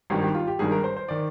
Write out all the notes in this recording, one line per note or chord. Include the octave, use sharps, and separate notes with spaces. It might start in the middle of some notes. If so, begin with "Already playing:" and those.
G#1 G2 D#3 G4
G4
F4
G4
G#1 G2 D#3 G#4
A#4
C5
C5
D#3 D5